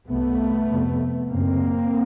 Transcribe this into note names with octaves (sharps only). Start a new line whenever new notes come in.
C2 C3 A3 B3
F2 C3
F#2 C#3 A#3 C4